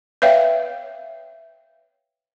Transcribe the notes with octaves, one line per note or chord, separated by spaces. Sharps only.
B4 C#5 E5 F5 G5